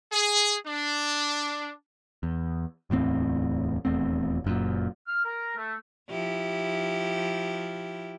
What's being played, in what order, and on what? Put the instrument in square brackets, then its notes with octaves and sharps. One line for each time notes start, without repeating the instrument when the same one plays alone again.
[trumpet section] G#4
D4
[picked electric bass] E2
D1 E2 A2 C4
D#1 E2 A3 C4
F#1 F#2 A#2
[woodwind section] F6
A#4
A3
[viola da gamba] F3 E4 G4